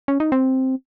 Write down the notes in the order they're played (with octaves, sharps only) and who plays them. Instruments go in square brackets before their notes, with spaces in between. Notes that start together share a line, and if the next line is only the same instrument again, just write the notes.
[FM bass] C#4
D#4
C4